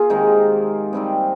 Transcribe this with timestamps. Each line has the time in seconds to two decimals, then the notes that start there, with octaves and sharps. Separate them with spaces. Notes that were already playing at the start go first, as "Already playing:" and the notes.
Already playing: A#3 F4 G#4
0.10 C3 D#3 G#3 D#4
0.93 C3 G3 C4 D#4